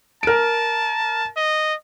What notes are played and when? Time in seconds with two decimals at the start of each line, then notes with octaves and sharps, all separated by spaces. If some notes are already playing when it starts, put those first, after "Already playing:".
0.23 A#4 A5 D7
1.37 D#5